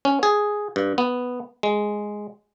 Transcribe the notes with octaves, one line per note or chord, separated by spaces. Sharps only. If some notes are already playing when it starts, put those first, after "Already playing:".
C#4
G#4
G2
B3
G#3